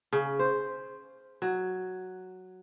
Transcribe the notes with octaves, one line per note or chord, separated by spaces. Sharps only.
C#3
C5
F#3